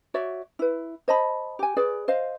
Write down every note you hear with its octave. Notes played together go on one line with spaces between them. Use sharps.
F#4 C#5 D5 E5
E4 B4
C5 D#5 A5 B5
G4 G#5
G#4 B4 D5
C5 D#5 F5